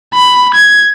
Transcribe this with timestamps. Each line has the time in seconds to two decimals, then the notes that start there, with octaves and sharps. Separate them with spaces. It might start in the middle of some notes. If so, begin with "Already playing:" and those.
0.14 B5
0.54 G#6